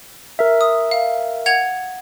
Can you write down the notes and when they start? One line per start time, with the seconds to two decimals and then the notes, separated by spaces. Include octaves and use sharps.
0.39 A#4 E5
0.61 D#6
0.91 F5
1.46 F#5 G#6 F7